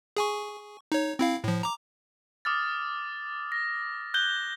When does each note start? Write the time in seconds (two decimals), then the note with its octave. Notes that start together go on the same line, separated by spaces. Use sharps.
0.17 G#4 G#5 C#6
0.92 D#4 C#5
1.19 C4 E4 F5
1.44 A2 F3
1.63 A#5 D6
2.45 D6 D#6 F6 A6
3.52 A#6
4.14 F#6 G6 G7